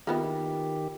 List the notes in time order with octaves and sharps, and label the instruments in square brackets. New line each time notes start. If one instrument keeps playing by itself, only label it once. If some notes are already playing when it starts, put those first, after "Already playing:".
[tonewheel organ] D#3 G4 [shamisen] A#3 B3 E4 [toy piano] F4 G5